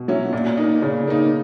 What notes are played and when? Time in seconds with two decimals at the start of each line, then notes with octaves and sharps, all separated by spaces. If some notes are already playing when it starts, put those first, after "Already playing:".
Already playing: B2
0.08 F#3 C#4 E4
0.33 A#2
0.57 A#3 D#4
0.82 A#2 C#3
1.07 A#3 D#4